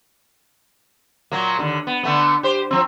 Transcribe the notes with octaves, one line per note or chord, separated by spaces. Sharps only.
A#2 F#3 A#3
D#2 D3
B3
D3 A3 B3
G4 C5
F3 C4